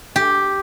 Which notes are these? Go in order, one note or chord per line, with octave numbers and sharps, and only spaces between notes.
G4